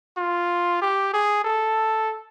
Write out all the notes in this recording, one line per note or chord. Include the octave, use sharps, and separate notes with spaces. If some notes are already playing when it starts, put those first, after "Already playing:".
F4
G4
G#4
A4